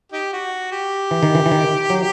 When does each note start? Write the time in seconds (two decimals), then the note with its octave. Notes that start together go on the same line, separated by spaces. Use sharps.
0.12 D#4 G4
0.33 F#4
0.72 G4
1.11 E3
1.23 D#3
1.35 E3
1.46 E3
1.52 D#3
1.90 F#3